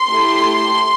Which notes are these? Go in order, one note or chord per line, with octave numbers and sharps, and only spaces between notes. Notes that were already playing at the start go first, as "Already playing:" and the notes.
Already playing: C6
A3 E4 G4